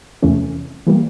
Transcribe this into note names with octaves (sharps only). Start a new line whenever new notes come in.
E2 C3 E3 A3 C#4
E3 G3 A#3